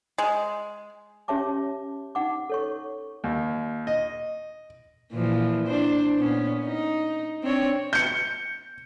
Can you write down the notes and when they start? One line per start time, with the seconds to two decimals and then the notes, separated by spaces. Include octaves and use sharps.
0.18 G#3
1.28 C#4 G4 C#5 E5 A5 D6
2.15 D#4 F#5 D6
2.50 A4 C#5 C#6
3.24 D#2
3.87 D#5
5.12 A#2 E3 F3
5.67 D4 C5
6.17 A#2 B3 C#4
6.66 D#4
7.43 C4 D4 C#5
7.93 G6 C#7